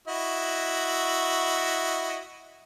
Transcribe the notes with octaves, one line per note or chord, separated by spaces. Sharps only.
E4 F#4 D#5